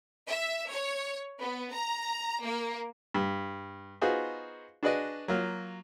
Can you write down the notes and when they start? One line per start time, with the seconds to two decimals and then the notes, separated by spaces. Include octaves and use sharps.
0.28 E5
0.70 C#5
1.39 B3
1.72 A#5
2.44 A#3
3.14 G2
4.01 B3 D#4 F4 F#4 G#4 C5
4.83 D4 F#4 G#4 B4 D5 D#5
5.28 F#3 A#3 F4